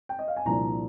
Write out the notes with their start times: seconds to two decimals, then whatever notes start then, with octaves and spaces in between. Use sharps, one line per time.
0.09 G5
0.19 D#5
0.28 F5
0.36 G#5
0.45 C2 A#2 F3 A#3 D4 A#5